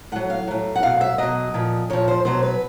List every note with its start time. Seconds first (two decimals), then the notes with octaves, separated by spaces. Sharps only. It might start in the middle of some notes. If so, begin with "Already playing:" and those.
0.12 A2 F#3 F#5
0.30 F5
0.47 A2 F#3
0.76 F#5
0.83 B2 F#3 F5
1.01 E5
1.18 B2 F#3 D#5
1.54 A#2 F3
1.90 A#2 F3 C#5
2.08 C5
2.25 B2 F#3 C5
2.43 B4